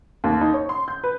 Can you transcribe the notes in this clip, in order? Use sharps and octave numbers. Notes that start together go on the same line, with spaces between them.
D#2
D#4
C#5
C6
G6
B4